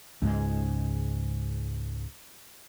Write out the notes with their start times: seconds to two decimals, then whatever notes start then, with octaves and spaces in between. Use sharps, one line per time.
0.22 C#2 G#2 G#3